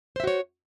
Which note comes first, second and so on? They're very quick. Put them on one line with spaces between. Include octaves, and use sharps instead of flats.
C5 E5 F#4 C#5